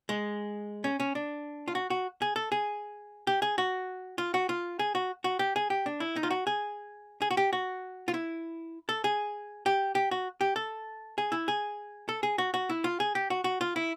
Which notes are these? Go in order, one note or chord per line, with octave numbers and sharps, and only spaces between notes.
G#3
C#4
C#4
D4
F4
F#4
F#4
G#4
A4
G#4
G4
G#4
F#4
F4
F#4
F4
G#4
F#4
F#4
G4
G#4
G4
D4
E4
D#4
F4
F#4
G#4
G#4
F#4
G4
F#4
F4
E4
A4
G#4
G4
G4
F#4
G4
A4
G#4
E4
G#4
A4
G#4
F#4
F#4
E4
F4
G#4
G4
F#4
F#4
F4
E4